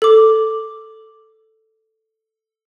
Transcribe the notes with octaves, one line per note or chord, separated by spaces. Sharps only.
A4 D6